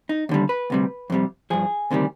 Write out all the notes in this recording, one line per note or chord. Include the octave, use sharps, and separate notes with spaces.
D#4
D#2 D3 G3
B4
D2 C3 G3
F2 C3 G3
G2 F3 G#4
D2 C3 D#3 G3